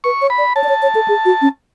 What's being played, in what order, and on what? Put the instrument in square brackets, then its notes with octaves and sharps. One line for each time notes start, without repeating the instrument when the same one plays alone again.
[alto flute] B4 [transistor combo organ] C#6
[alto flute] C#5
[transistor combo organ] B5
[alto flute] D5
[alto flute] C#5 [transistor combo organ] A5
[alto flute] D5
C#5
C#5
A4
G#4
F#4
C#4